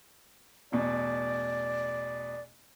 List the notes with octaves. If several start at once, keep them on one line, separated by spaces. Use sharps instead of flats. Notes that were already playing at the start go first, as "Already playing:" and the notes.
A1 E2 B2 D5